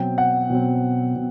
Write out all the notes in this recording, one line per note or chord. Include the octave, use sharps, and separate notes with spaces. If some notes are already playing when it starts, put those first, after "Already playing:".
Already playing: B2 F#3 C4 G5
F#5
B2 F#3 C4
B2